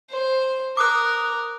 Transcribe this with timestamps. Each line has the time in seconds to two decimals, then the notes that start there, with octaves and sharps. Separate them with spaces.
0.11 C5
0.77 A#4 D6 D#6 F#6